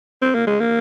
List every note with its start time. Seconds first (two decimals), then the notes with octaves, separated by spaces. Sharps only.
0.22 C4
0.34 A#3
0.47 G#3
0.60 A#3